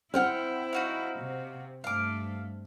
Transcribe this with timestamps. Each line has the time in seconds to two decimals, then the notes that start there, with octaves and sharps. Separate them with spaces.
0.14 C4 E4 F#5 G5 F6
0.73 D#4 F#4 F5
1.20 C3
1.84 G2 A3 F5 D6